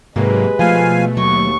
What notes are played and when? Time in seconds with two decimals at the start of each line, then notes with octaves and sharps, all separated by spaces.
0.16 G#2 C3 F#3 G#3 A#3 B4
0.59 B2 F3 A3 F5 G#5
1.17 D#2 F#3 C#6